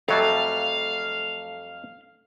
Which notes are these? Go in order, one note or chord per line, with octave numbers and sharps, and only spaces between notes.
F2 F#3 G3 A3 A4 F5